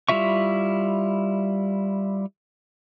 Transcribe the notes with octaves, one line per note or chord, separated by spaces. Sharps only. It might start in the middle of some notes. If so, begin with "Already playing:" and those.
G3 E4 F4 E5 C#6